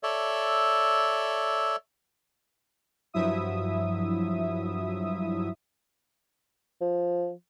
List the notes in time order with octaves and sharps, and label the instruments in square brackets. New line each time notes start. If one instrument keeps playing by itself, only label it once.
[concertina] A4 C#5 D5 E5
[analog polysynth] G2 F3 F#3 E4 E5 D#6
[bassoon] F3